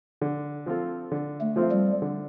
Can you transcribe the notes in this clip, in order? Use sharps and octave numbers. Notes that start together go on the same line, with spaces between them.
D3
F3 C4 F4 A4
D3
A3
F3 C4 F4 A4
G3
D3